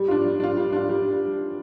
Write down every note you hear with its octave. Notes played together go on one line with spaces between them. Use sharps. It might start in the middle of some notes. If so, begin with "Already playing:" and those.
Already playing: G3
D4 F4
G3
D4 F4
G3
D4 F4
G3